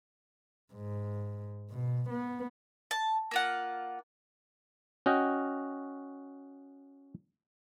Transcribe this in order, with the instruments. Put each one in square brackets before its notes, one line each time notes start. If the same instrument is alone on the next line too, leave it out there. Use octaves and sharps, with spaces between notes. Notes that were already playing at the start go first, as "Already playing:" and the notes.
[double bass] G#2
B2
B3
[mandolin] A5
A#3 F4 F#5
[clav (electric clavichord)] C#4 F#4 D#5 G5